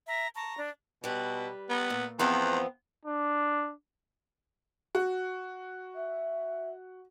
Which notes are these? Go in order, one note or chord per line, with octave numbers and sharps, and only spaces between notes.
E5 A#5
A5 A#5 C#6
D4
B2 G3 B4
B3
A#2
E2 F3 B3 C4
D4
F#4
E5